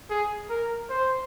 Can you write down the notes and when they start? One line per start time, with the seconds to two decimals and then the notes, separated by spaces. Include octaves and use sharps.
0.10 G#4
0.50 A#4
0.89 C5